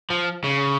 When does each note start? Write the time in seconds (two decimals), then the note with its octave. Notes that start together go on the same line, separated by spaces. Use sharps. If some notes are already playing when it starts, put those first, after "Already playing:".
0.10 F3
0.44 C#3